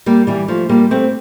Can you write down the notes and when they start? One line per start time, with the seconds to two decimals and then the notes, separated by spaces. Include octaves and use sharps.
0.06 G3 A#3
0.27 E3 G3
0.48 F3 A3
0.69 G3 A#3
0.91 A3 C4